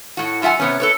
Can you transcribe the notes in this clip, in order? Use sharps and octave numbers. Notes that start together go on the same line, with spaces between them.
A2 F#4
F#2 F4 E5 F#5 G#5
C3 B3 C#4
A4 B4 C#5